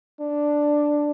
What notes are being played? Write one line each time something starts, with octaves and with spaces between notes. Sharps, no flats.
D4